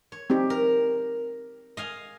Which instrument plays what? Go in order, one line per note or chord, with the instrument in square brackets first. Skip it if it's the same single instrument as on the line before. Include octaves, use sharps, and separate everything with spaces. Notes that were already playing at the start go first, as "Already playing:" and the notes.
[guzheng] C#5
[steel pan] C4 D#4 G4
[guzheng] A#4
D#5 F5 G#5